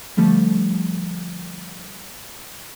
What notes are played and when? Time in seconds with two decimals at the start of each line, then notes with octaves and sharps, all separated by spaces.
0.17 D3 F3 G3 A3